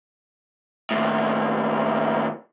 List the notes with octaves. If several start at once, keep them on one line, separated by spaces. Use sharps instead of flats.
D#2 A2